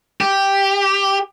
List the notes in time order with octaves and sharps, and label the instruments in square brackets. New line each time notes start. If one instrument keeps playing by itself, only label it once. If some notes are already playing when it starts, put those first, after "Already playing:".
[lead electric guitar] G4